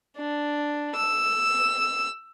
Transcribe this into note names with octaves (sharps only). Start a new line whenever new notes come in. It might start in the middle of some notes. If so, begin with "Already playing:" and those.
D4
E6